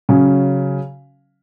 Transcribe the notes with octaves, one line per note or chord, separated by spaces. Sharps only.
C#3 F#3 C#4